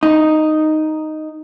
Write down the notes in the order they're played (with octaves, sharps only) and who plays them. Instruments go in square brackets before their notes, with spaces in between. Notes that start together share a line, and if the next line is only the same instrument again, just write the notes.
[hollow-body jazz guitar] D#4